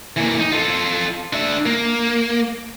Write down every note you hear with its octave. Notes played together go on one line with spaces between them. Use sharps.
E3 A#3
D#4
F4 A4
D4 E5
A#3